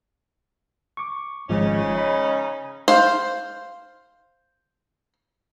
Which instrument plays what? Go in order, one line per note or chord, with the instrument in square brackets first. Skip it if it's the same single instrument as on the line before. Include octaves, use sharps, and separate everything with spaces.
[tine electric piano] C#6 D6
[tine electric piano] G#1 F3 G#3 [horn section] C#3 C#4 D#4
[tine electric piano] D#5 B5
[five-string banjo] C5 F5